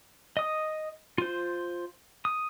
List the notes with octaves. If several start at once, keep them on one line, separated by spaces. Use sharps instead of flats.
D#5 D#6
F4 C5
D#6